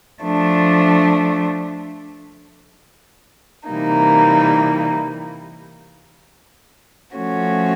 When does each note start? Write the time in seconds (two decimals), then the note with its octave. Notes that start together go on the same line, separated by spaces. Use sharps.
0.22 F3 A3 D4
3.68 C3 E3 G3 A#3 D#4
7.16 F3 A3 C#4 F#4